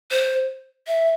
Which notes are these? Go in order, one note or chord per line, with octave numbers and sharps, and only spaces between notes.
C5
E5